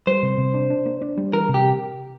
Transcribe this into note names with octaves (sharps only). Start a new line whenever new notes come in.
G3 C5
C3
C3
D4
D4
A#3
D4
G3
E3 A#4
C3
G4